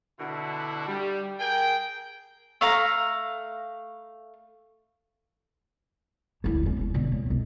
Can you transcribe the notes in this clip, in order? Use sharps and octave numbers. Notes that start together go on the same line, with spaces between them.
B2 D3 E4 F#4
G3
G#4 A#4 G5
A3 F5 A#5
D2 E4
E1 C#4
C4 C#4
B1 D3
A2
B1 C4